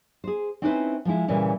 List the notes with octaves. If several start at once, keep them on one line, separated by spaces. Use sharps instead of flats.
G#4 C5
C4 C#4 D#4 E4 B4 C5
F3 G#3 E4
A#2 C#3 E3 G3 C#4